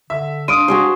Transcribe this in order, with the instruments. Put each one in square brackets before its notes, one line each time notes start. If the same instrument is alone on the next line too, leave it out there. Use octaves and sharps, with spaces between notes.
[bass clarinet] D3 [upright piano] E5
[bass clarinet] D4 [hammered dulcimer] F5 [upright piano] C6 [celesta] D#6 D7 D#7
[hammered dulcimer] F#4 G#4 C5